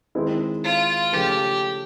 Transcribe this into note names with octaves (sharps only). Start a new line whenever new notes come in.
D#3 G#3 C4 E4
F4
C#3 F3 A3 G4